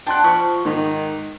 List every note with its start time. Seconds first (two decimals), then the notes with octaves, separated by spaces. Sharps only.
0.07 D4 F#5 G5 C6 F#6
0.24 F3 B5 C#6
0.65 G#2 D#3